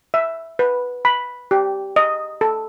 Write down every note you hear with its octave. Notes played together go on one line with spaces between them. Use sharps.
E5
B4
B5
G4
D#5
A4